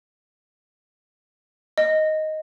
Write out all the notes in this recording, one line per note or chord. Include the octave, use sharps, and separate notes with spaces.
D#5